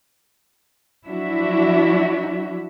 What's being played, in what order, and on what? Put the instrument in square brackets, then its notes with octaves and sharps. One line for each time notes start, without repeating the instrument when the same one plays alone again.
[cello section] F3 F#3 D4 E4 F#4 E5